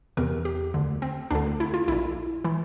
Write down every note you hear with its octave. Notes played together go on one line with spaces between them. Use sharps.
E2 C3 E3 A#4
G4
D2 D3
C4
D2 D3 D4
E4
F4
A#1 A#2 E4
E3 E4